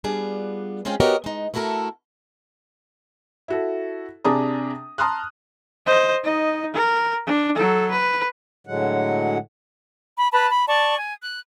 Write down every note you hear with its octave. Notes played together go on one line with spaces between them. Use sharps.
G3 B3 D4 F4 G#4
G#3 C4 C#4 F4 G#4 G5
B3 F#4 G4 A#4 C#5 D#5
G#3 D#4
A3 E4 F#4 A4 A#4
E4 F#4 A4
C3 D4 G#4 A5 A#5 D#6
A5 A#5 C6 D#6 F6 F#6
C5 D#5
D#4 D#5
A#4
D4
F#3 A4
B4
A2 D3 F#3 G#3 F#5
B5
B4 A5 B5
B5
D5 A5 C#6
G#5
F#6